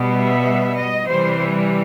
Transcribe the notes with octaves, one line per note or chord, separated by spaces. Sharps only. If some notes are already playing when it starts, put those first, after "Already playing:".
Already playing: B2 G3 B3
E5
D#5
C3 E3 G3 C5